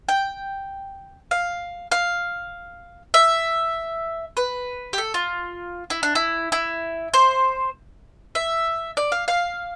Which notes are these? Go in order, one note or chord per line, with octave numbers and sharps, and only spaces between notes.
G5
F5
F5
E5
B4
G4
A4
F4
E4
D4
E4
E4
C5
E5
D5
F5
F5